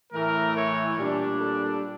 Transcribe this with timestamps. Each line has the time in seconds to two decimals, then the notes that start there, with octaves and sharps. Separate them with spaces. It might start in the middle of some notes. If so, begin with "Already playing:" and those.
0.12 A2 E3 A3 A#4
0.55 C#5
0.97 A#2 G3 D4
1.40 A4